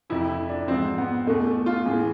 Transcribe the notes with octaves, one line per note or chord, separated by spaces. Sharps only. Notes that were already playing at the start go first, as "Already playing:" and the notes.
F2 C3 F3 E4
E4
D4
G#2 F3 C4
B3
E2 B2 A3
A3
F4
A2 E3 G#4